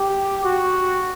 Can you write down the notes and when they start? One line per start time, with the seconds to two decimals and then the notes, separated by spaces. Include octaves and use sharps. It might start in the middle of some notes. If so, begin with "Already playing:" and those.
Already playing: G4
0.44 F#4